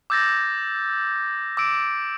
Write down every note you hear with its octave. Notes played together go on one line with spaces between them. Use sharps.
D6 E6 G6 A6 A#6
D6 E6 D7